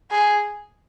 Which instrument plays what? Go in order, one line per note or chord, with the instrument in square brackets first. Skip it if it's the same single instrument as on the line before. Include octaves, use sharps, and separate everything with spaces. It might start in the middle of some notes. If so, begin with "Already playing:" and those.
[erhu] G#4